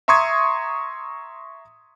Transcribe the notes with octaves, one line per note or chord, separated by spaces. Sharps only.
E5 A#5 C6 C#6 D#6 G#6